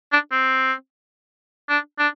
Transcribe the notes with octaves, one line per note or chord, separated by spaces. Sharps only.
D4
C4
D4
D4